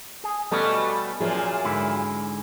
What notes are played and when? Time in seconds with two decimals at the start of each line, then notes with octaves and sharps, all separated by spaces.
0.24 G#4
0.51 B2 G3 A3 B3 C#4 F#4
1.20 F#2 A#2 F3 G#4 E5
1.64 G#2 D3 E4